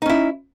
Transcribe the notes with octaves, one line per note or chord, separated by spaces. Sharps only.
C#4 D#4 E4